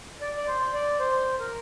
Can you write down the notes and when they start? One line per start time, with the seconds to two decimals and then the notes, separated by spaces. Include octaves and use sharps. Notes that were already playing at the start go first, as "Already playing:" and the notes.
0.21 D5
0.37 D5
0.47 C5
0.74 D5
1.00 C5
1.40 A#4